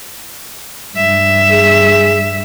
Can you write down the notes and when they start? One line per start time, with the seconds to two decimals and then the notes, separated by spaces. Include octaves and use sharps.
0.97 G2 E5
1.51 G#4